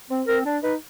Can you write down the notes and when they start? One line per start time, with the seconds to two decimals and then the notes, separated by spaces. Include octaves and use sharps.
0.09 C4
0.27 C4 A#4
0.45 D4
0.63 D#4 B4